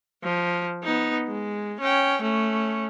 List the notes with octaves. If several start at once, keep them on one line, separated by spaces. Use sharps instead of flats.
F3
B3 D#4
G#3
C#4 G5
A3 C#4